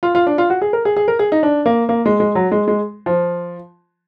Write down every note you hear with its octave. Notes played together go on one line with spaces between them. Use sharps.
F4
F4
D4
F4
F#4
G#4
A#4
G#4
G#4
A#4
G#4
D#4
D4
A#3
A#3
G#3
G#3
F#3
G#3
G#3
F3